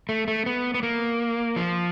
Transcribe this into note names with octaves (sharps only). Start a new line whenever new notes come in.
A3
A3
B3
B3
A#3
F3